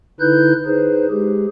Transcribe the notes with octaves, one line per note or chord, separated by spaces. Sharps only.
D3 D#4 E4 B4 F#6 G6
D#4 G#4 B4 C5
G#3 G4 G#4